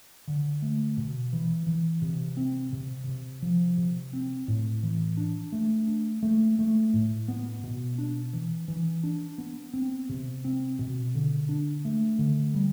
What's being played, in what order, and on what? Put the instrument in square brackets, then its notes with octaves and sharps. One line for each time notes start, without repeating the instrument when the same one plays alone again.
[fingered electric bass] D3
A3
B2
E3
E3
C3
C4
C3
C3
F3
C3
C4
A2
E3
D4
A3
D4
A3
A3
A2
B3
B2
D4
E3
E3
D4
B3
C4
C3
C4
B2
D3
D4
A3
D3
G3